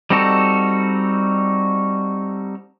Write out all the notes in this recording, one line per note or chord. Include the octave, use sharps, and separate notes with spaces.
G3 C4 D#4 F#4 A4